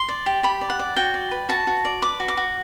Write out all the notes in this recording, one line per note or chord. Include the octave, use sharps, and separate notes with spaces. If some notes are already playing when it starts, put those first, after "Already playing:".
Already playing: C6
D5
G4
G4 B5
D5
F#5
D5
F#4 G5
D5
B4
F#4 A5
F#4
D5
B4 D6
F#4
D6
F#4